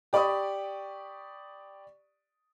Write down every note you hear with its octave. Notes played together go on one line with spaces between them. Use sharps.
G4 D5 B5 C#6 D#6